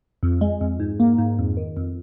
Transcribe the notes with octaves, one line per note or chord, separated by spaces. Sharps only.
F2
G#3
F2
G#2
A#3
G#2
F2
D#3
F2